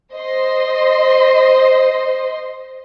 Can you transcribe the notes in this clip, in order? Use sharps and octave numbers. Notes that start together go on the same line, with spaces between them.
C5 D#5 C6